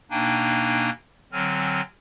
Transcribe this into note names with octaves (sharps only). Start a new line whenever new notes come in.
B2 A#3 D4 D#4 G5 G#5
D3 F#3 C4 G#5 F6